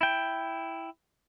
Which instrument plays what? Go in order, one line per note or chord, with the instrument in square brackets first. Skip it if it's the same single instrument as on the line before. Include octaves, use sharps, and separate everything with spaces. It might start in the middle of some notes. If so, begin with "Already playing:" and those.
[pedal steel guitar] E4 G5